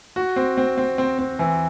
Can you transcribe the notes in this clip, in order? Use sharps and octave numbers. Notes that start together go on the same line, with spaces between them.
F#4
C4
C4
C4
C4
C4
E3